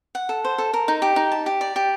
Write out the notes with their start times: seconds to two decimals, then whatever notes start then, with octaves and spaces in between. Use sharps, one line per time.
0.15 F#5
0.29 A4
0.44 C5
0.58 A4
0.73 A#4
0.88 D#4
1.02 G4
1.16 D#4
1.32 A5
1.46 G4
1.61 D5
1.76 G4